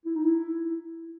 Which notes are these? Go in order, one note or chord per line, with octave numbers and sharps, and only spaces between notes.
E4
D#4
E4